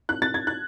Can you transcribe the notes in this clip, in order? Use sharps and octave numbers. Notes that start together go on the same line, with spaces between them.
F#6
A6
G#6
F#6